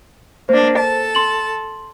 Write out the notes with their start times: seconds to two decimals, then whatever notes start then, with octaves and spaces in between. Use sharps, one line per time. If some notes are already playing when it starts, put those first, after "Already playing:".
0.49 A#3 D4 C5
0.78 A4 A5
1.15 C6 F#7